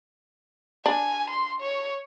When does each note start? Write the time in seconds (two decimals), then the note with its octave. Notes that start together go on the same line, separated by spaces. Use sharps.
0.86 D4 G#5
1.30 C6
1.60 C#5